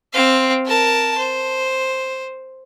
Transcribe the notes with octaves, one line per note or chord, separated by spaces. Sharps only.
C4 F5
A#4 A5
C5